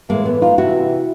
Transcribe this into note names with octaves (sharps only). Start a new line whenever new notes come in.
A2 E3 G#3 A#3
A3 B3
D#4 F4
C3 E3 E4 F#4